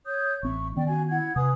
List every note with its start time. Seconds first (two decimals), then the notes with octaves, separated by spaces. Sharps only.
0.06 C#5 D#6 G6
0.43 A1 C4 E5 C#6
0.76 D#3 B3 C#4 D5 G5
0.87 F#4 G#5
1.10 E4 F#5 G#6
1.36 C3 B4 G#5 D#6